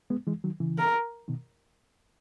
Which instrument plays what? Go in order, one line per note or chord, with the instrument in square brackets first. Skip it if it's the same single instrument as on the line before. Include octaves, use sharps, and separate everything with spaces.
[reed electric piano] G#3 B3
E3 G#3
D#3 F#3
C#3 E3
[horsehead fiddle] A#4
[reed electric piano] B2 D#3